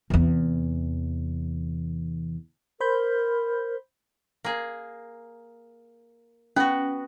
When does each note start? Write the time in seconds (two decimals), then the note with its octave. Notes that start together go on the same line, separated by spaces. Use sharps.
0.10 E2 C3
2.80 A#4 C5 B5 G6
4.44 A#3 G#4
6.56 B3 C#4 F#4